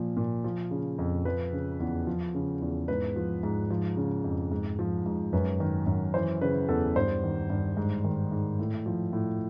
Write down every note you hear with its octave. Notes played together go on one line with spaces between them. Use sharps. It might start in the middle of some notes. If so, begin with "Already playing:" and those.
Already playing: A#2 F3
A#2
F3
C#3
F2
F3 B4
C#3
E2
F3
C#3
E2
G#2 B4
F3
G#2
F3
C#3
F2
G#2
F3
G#2
F#2 B4
D#3
F#2
E3 C5
C#3 B4
E2 A4
G2 C5
D#3
G2
G#2
D#3
G#2
A2
F3
A2